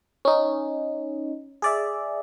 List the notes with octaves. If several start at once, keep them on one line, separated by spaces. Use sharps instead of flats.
C#4 D#4
G#4 D5 E5